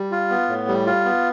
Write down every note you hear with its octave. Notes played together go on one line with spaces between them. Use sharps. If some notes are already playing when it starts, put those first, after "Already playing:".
Already playing: G3
F4
B3
A2
G3
F4
B3